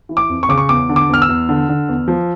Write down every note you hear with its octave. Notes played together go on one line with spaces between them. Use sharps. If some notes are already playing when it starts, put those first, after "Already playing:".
E3
D6
F2
C#6
C#3 D6
C#6
E2 D6
D3
D6
E2 F6
E6
E2
D3
D3
E2
F3